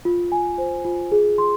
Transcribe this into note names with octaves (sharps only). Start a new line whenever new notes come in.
F4
G#5
C5
F4
G#4
C6